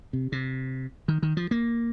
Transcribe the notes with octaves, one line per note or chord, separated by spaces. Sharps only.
C3
C3
D#3
D#3
F3
A#3